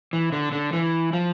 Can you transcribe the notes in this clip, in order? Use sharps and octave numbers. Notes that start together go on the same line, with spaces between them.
E3
D3
D3
E3
F3